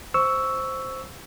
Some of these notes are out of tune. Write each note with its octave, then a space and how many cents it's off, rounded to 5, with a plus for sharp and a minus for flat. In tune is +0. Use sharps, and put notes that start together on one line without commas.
C5 +0 C#6 +10 E6 +0